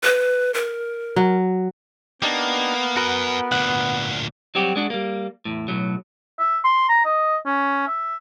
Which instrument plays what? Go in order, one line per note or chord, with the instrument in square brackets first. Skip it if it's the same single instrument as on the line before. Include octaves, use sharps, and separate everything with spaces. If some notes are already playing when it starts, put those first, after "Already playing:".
[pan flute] B4
A#4
[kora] F#3
[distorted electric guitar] A#3 [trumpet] B3 [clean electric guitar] D4 D#4 G4
[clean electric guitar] F#4 A#4 B4 [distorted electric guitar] F#5 G#5
[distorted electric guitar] D2 A#2 [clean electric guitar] F#5
[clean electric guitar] F#3 G3 C4 F#4 G4
G#3 D4 F#4
G3 A#3
E2 A2
B1 A2 F#3
[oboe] E5
C6
A#5
D#5
C#4
E5